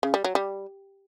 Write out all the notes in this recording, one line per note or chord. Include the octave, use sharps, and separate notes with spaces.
C#3
G3
F#3
G3